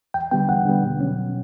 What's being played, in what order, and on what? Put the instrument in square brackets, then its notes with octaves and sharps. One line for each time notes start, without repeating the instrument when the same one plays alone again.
[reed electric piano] E2 G5
D3 G3 B3 G5
E2 F#5
D3 G3 B3
B2
F#3 C#4
B2